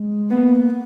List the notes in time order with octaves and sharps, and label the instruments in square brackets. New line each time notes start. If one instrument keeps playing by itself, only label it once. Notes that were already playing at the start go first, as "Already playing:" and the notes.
Already playing: [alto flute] G#3
[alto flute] A#3 [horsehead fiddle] B3
[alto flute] B3